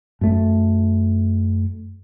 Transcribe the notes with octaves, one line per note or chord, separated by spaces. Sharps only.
F#2 A3